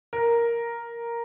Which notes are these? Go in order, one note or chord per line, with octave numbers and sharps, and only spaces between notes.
A#4